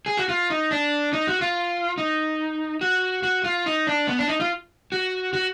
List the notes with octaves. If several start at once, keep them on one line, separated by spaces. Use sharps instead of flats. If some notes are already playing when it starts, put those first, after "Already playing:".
G#4
F#4
F4
D#4
D4
D#4
F#4
F4
D#4
F#4
F#4
F4
D#4
D4
B3
D4
D#4
F4
F#4
F#4